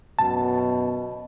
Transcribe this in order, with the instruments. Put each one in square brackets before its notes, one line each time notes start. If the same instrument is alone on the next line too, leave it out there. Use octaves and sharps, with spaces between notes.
[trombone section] F#2 B2 [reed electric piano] A5